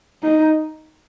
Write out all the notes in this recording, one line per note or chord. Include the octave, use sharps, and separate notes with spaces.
D#4